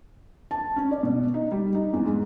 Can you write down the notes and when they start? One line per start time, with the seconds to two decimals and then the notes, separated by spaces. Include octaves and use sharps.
0.51 A5
0.76 C#4
0.91 D5
1.03 B2
1.34 D#4
1.51 G3
1.75 D#4
1.93 E2
2.05 G#2